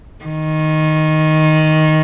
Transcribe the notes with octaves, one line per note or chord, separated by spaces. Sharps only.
D#3